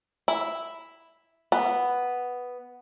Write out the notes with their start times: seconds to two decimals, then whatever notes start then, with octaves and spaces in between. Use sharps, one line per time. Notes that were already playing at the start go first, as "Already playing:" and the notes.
0.28 E4
1.52 B3